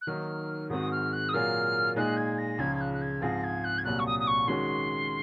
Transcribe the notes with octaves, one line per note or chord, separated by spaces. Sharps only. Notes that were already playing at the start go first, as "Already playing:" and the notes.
F#6
D#3 F#3 A#3 D#4 F6
G#2 D#3 G#3 C4 F#4 D#6
F6
F#6
D#6
A#2 F#3 A#3 F4 G#4 F6
A#2 G#3 D#4 G#4 F#6
G#6
A#6
C#2 C#3 F3 G#6
G#6
F#6
F#6
G#6
G#2 F3 C4 F4 G#4 A#6
G#6
F#6
G#6
C2 A#2 F#3 F#6
C#6
D#6
D#6
C#6
D#3 G#3 C#4 F#4 C6